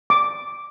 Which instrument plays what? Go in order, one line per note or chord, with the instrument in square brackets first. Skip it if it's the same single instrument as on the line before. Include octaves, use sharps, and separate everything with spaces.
[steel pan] D6